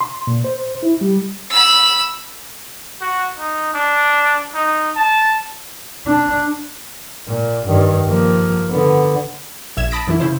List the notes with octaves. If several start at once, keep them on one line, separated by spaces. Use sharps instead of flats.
C6
A#2
C5
E4
G3
B5 E6
F#4
D#4
D4
D#4
A5
D4
A#2
G2 D#3
F3 A#3
D3 B3
A#1 E5 G#6 E7
A5 B5 D#6 A#6 B6 D7
F#2 E3 E4
C#3 E4 C5